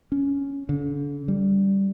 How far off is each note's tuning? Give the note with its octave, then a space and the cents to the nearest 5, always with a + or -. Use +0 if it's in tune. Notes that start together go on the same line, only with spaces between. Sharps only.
C#4 +10
D3 -40
G3 -5